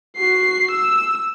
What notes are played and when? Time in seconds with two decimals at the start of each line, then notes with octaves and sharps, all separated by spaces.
0.16 F#4 C7
0.71 E6